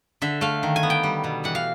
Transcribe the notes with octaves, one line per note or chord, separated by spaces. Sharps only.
D3 E5
A3 F5
D#3
G#5
B3
G5
G3
B2
E3 F#5
F5